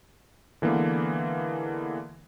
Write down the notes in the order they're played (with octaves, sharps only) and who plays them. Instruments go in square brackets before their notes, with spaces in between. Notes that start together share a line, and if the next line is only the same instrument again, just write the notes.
[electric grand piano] D3 E3 G#3 A#3 B3